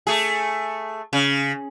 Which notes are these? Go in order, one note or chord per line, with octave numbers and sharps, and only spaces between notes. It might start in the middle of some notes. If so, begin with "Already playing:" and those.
A3 G#4
C#3